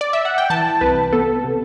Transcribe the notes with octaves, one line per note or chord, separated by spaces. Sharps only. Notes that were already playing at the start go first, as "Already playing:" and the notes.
D5
E5
F#5
G5
E3 A5
C2 B4
B3 A4
C3